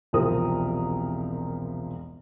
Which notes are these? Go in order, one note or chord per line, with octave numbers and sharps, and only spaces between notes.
E1 C2 F3 C4 A#4 D#6